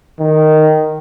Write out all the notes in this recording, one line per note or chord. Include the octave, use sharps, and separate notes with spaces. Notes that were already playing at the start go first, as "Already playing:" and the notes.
D#3